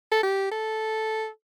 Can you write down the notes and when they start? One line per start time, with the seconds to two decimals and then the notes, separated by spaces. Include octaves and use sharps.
0.12 A4
0.23 G4
0.51 A4